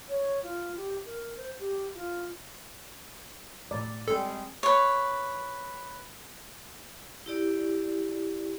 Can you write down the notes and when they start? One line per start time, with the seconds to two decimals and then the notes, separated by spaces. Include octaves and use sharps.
0.08 C#5
0.43 F4
0.76 G4
1.05 A#4
1.36 C5
1.59 G4
1.94 F4
3.71 A2 D5
4.08 G3 G#3 C4 A4
4.63 B4 C#5
7.26 E4 G4 D5